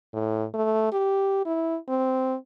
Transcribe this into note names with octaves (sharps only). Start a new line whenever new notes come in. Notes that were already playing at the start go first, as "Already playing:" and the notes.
A2
A3
G4
E4
C4